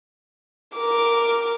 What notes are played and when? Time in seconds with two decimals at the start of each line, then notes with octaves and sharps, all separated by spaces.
0.77 A#4 D6